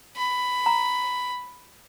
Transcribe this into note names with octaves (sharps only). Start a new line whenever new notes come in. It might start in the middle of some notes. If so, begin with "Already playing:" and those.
B5
A#5